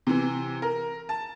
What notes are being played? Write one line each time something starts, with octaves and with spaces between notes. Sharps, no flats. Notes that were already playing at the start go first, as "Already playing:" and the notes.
C3 E3
A#4
A5